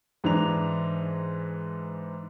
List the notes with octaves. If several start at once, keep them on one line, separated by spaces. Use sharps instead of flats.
G#2 E3 D4 A#5 F7